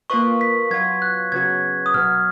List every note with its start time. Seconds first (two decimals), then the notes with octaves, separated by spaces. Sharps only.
0.10 A#3 F4 B4 D#5 C#6
0.41 B6
0.71 F#3 B3 F4 G#6
1.02 F#6
1.32 C#3 F#3 B3 F#4 G#6
1.86 D#6
1.94 B2 F#3 B3 F6